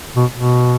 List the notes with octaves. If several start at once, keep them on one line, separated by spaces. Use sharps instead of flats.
B2
B2